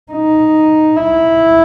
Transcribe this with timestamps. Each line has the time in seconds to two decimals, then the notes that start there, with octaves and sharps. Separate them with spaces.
0.12 D#4
0.96 E4